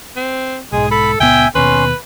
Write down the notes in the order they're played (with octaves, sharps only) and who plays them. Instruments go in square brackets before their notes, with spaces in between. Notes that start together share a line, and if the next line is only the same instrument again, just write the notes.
[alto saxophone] C4
[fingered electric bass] B1 G#2 [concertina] G#3 [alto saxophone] G#4
[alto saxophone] A4 [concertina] B5
[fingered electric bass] C#2 A#2 B3 [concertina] E5 G#5 [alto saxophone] G5
[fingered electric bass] D#2 B2 [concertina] C#4 C6 [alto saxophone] B4